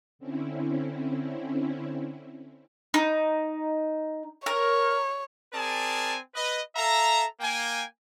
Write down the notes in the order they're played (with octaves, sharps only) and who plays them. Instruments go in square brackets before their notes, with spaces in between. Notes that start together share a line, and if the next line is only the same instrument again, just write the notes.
[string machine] D3 C4 C#4 E4
[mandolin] D#4
[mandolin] A#4 [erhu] C#5
[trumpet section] C4 G#4 A#4 D5 G#5 A5
B4 D#5
A4 E5 F5 A#5
A#3 G5 G#5